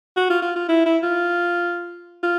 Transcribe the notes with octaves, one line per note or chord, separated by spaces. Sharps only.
F#4
F4
F4
F4
E4
E4
F4
F4